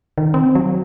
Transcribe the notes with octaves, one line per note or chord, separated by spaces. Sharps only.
D#3
C4
F#3